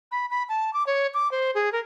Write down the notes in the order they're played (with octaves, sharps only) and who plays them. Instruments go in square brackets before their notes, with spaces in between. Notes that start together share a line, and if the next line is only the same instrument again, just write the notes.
[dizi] B5
B5
A5
D6
C#5
D6
C5
G#4
A#4